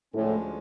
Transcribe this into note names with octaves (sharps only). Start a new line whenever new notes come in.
D2 A2 D3 F3 G#3 C#4